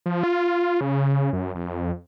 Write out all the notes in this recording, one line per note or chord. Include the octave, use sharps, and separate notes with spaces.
F3
F4
C#3
F#2
F2